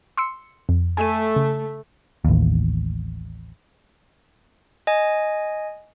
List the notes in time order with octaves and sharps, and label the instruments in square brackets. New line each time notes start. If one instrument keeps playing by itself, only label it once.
[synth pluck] C6 E6 C#7
F2
[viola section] A3 [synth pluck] G#5 D#7
[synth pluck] C#3
[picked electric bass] A1 D#2
[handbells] D#5 G#5